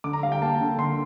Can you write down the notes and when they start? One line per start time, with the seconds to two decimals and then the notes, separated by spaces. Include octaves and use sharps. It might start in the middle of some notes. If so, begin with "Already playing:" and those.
0.04 D3 D6
0.13 A#5
0.23 G3 F5
0.32 G5
0.41 A#3 A5
0.61 D3
0.79 D3 C6